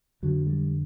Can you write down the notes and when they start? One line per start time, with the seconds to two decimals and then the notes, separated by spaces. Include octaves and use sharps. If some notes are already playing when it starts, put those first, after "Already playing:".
0.22 F2 D3 F#3
0.47 G3